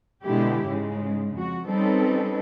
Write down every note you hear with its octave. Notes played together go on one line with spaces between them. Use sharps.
B2 D3 G#3 E4 G4
G#2 C#3 G#3
F2 F#4
G3 C4 C#4 D#4 A4 B4